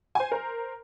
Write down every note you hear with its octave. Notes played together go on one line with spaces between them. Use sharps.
C5 G#5
A#4 C5